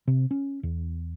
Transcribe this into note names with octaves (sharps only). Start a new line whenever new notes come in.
C3
C#4
E2